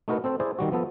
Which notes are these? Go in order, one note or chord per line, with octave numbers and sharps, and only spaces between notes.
A3 D#4 F#4 A#4 B4 F#5
C4 A4 C5
E4 G#4 C5 D5
D#3 G3 F#4
F3 B3 A4